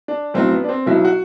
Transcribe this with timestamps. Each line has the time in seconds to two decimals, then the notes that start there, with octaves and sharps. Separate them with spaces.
0.08 D4
0.34 B1 A2 F#3 C4
0.51 B3
0.64 D4
0.69 C4
0.86 B1 B2 F#3 E4
1.05 F#4